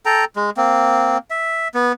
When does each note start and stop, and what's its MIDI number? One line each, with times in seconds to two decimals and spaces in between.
0.06 0.25 69
0.06 0.25 79
0.06 0.25 82
0.36 0.50 56
0.57 1.18 58
0.57 1.18 60
1.30 1.68 76
1.74 1.92 59